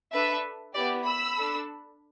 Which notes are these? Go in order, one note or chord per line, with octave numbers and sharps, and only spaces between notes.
D4 A4 B4 E5
B3 E4 G4 D5
B5 E6
D4 A4